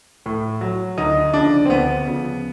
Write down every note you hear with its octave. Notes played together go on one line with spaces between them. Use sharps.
A2
F#3
D2 D#4
C#3 F3 D4
C4
D2 B3
C#3 F3